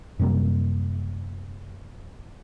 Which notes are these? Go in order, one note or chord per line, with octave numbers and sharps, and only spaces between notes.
F#2 C3 G3 A#3